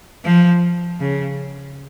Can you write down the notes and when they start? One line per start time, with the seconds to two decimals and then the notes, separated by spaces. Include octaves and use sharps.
0.24 F3
0.99 C#3